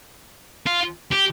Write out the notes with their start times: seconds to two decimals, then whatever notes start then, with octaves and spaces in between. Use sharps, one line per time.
0.67 F4
1.11 G4